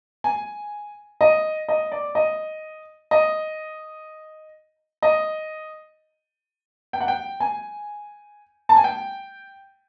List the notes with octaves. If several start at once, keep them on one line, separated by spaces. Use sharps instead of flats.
G#5
D#5
D#5
D5
D#5
D#5
D#5
G5
F#5
G5
G#5
A5
G#5
G5